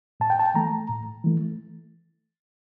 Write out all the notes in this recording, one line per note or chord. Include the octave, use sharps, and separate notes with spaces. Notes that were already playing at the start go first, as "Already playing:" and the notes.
A2 A5
G5
A5
E3 A3 A#5
A2
E3 A3